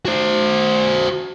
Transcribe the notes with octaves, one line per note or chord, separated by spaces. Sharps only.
F#4 C5